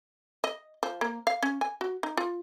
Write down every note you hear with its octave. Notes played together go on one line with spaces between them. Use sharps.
D#5
F3
A#3
F5
C#4
G#5
F#4
D#4
F4